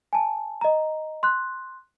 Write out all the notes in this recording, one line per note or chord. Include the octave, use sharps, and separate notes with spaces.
G#5 A5
D#5 A#5
C6 F#6